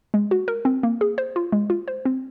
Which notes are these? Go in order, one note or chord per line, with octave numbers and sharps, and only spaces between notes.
G#3
F#4
A#4
C4
A#3
G#4
C5
F4
G#3
F4
C5
C4